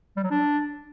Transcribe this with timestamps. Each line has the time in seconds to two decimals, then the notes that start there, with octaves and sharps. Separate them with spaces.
0.17 G3
0.24 F#3
0.31 D4